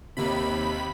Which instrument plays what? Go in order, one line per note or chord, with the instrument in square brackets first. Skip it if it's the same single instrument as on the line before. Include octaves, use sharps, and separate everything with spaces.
[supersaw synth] D#2 B5 [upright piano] C3